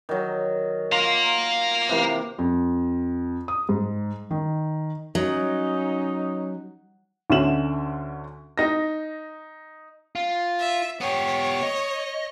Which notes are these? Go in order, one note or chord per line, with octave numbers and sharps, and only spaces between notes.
D#3 F#3
F4 F5 A#5
C3 E3 A#3
F2
D#6
G#2
D#3
F#3 C#4 D#4
D2 D3 C#4 E5 E7 F#7
D#4 A#6
F4
E5
B3 G4 C#5
D#5